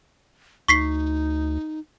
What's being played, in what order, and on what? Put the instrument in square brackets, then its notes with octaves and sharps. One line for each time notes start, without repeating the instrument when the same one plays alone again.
[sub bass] D2 [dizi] D#4 [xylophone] C#6 B6 C7